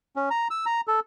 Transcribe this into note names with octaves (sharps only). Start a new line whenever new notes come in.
C#4
A#5
E6
A#5
A4